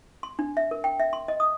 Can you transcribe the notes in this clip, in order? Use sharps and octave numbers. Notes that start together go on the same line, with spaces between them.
C6
D4
E5
A#4
G5
E5
C6
D#5
D#6